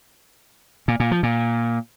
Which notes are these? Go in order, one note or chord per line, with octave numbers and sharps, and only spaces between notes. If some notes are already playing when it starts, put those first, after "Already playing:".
A#2
A#2
F3
A#2